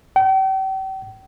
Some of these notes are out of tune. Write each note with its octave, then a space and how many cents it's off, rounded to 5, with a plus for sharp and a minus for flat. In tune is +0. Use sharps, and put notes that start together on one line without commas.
G5 -40